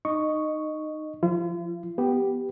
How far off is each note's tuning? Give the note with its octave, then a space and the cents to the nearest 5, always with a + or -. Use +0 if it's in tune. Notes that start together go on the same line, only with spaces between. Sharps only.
D#4 -15 D#5 -10 C#6 +0
F3 +0 F4 -40
B3 +0 G4 +0